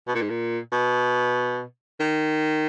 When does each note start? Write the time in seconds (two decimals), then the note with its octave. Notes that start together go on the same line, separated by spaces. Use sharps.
0.08 B2
0.15 A#2
0.22 G#2
0.30 A#2
0.72 B2
2.00 D#3